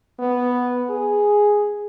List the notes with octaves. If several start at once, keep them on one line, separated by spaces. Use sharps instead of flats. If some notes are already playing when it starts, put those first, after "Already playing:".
B3
G#4